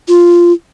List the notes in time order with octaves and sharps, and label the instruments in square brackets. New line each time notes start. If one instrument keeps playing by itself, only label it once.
[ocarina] F4